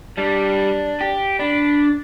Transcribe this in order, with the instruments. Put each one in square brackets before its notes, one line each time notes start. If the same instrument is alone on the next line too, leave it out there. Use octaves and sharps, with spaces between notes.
[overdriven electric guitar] G3 [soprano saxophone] D4
[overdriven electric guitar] G4
[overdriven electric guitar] D4 [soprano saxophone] B5